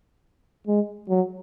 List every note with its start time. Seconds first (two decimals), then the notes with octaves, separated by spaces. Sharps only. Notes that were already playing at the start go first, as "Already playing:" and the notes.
0.67 G#3
1.09 F#3